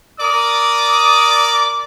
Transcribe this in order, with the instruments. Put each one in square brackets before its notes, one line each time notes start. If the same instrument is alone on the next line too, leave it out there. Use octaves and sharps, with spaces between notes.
[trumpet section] A#4 D5 D6 [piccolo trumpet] D#6